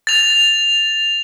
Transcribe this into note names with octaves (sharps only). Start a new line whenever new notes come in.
A6 F7